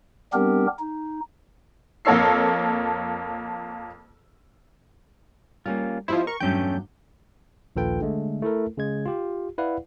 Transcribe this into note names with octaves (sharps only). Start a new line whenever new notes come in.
G3 B3 C4 D4 G4 A#4
D#4
F2 A#3 A4 C#5 E6 C7
G3 A#3 C#4 F4 A#4
F3 B3 E4 G4 C5 D#5
A#4 C#6
E2 G2 F#3 A3 C#4 G5 G6
A#1 D#2 F4 A4 B4 G5
D3 G#3 A3
A3 E4 A4 A#4
C#3 G#3 G#6
F4 G4
E4 B4 D5 F5 F#5